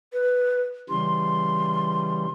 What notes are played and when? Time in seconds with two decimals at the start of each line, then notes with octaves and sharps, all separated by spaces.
0.13 B4
0.90 C#3 E3 G3 C6